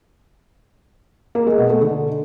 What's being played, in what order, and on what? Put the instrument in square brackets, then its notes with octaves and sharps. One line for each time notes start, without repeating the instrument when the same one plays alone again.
[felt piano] A#3
G#3
B2
A3
D3